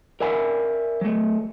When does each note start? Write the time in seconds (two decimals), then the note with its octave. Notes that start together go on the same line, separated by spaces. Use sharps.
0.20 A#4 D5 E5 G#5 B5
1.01 F#3 A3